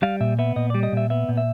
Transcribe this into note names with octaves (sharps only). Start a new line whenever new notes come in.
G3 F5
A#2 E5
B3 E5
A#2 D#5
G3 D5
D#5
A#2 E5
B3 E5
A#2
E5